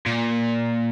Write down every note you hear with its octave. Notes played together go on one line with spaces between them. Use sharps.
A#2